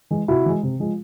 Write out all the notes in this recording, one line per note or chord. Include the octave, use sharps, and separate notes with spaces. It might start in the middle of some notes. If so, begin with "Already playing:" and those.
E3 G#3
C3 E4 F#4
E3 G#3
C3
F3 G#3